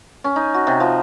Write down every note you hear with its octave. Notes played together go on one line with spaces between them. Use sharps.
C#4
D#4
F#4
C3
F3